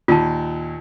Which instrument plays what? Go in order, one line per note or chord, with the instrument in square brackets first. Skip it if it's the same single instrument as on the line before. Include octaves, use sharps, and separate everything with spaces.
[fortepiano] D#2 A#2 [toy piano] F4 A5